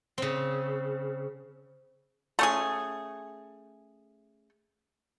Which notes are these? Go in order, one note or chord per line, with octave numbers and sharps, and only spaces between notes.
C#3 C4
A3 C#4 G#4